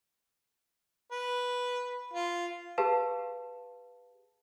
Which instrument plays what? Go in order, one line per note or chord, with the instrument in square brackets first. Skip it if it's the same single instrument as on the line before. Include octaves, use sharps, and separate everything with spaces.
[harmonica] B4
F4
[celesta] G4 G#4 B4 F5 A5